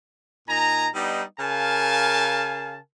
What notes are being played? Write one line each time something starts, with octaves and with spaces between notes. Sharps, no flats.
A#2 D#4 G#5 A#5
G3 B3 D4 D#4
C#3 A#4 F5 G#5 A5